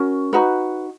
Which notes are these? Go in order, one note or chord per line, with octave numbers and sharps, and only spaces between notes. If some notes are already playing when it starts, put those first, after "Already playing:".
Already playing: C#4 F#4 A#4
D#4 F#4 B4